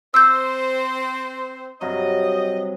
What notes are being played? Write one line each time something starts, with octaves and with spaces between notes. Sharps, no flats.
C4 C5 E6 G6
G2 C3 F#3 D#5